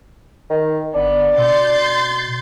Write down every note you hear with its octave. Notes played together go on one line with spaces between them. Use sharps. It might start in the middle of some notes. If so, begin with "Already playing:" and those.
D#3
G1 B3 D4
B2 C6 G6 A6